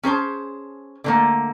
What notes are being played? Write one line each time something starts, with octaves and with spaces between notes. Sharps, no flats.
C#4 G#4 C5 A5
D3 A3 A#3